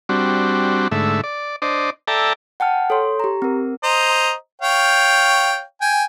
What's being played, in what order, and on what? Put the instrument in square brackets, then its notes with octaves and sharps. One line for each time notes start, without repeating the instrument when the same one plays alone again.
[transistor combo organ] G3 C4 D4 F#4
G#2 D3 A3 E5
D5
D4 C5 D5 D#5
A4 D5 E5 G5 A5 A#5
[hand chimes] F#5 G5 A5 F6
A4 C#5 C6
G4 A#5
C4 A#4
[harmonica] C5 D#5 A#5
C#5 F5 G5
G5 G#5